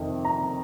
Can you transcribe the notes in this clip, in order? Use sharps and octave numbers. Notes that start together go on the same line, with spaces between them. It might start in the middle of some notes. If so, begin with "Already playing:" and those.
Already playing: F2 C3 D#3
A#5